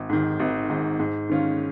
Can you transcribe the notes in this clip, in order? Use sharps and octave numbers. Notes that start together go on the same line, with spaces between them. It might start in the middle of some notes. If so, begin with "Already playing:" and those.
Already playing: G#1
G#2 D#3
G#1
G#2 D#3
G#2
D#3 G#3 C#4 F4